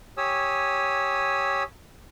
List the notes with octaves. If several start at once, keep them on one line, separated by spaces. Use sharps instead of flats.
G4 C#5 G#5 D#6 E6